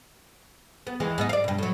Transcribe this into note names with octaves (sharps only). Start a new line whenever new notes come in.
B3
D#2 E3 G#3
G#2 B3 D#4
D5 F5
G2 B2
A2 F#3